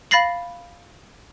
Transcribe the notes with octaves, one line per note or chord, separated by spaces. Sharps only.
F5 B5 A6 A#6 C7 F#7